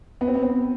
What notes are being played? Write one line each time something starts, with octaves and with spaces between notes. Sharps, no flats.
B3
C4
B3
C4
B3